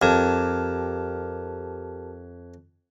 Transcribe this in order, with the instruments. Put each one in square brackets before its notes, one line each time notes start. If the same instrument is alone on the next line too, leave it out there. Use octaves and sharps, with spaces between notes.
[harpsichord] F2 [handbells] G4 A#4 A5